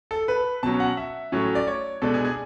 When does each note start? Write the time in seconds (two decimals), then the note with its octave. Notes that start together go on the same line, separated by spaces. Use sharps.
0.11 A4
0.28 B4
0.63 B2 F#3 C#4 A5
0.80 F#5
0.97 E5
1.32 A2 F#3 C#4
1.55 D5
1.67 C#5
2.02 B2 G#3 D4 A4
2.14 G#4
2.25 G#4